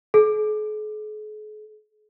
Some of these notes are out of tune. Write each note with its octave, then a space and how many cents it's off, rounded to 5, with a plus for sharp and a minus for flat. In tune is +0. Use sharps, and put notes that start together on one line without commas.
G#4 +45